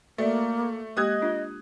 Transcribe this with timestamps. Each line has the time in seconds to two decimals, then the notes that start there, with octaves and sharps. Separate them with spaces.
0.18 A3 A#3 F#4 D5 E5
0.97 G#3 A#3 G4 D#5 D#6 F#6 G#6
1.22 D4 F4